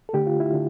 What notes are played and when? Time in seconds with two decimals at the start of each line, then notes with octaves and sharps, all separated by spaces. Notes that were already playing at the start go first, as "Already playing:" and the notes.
0.09 A4
0.13 D3 A3 G4
0.27 F4
0.40 E4
0.53 D3